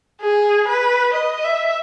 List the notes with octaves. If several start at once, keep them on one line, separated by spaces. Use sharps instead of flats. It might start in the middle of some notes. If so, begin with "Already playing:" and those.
G#4
B4
D#5
E5